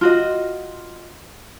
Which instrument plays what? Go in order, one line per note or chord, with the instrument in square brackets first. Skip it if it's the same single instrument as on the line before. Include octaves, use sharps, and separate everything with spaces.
[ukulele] F4 F#4 D#5